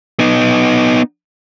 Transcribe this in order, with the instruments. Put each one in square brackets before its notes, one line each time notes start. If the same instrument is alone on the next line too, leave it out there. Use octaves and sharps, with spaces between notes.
[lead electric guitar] B3 D#4